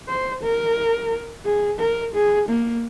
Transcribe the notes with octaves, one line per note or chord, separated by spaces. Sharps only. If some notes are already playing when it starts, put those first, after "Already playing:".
C5
A#4
G#4
A#4
G#4
A#3